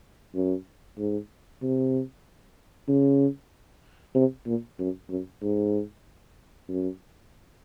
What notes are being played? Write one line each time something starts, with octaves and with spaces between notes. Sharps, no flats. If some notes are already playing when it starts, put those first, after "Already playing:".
F#2
G#2
C3
C#3
C3
A#2
F#2
F#2
G#2
F#2